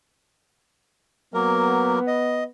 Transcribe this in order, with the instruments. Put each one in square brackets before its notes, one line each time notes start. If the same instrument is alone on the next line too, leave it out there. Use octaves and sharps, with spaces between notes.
[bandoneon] F#3 A#3 A#4 [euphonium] B3
[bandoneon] D#5